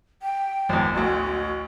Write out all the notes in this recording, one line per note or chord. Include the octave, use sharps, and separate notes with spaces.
G5
G#1 E2
A1 D2 F#4